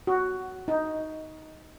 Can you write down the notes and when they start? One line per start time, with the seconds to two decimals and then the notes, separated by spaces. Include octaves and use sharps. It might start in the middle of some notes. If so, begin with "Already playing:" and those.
0.07 F#4
0.68 D#4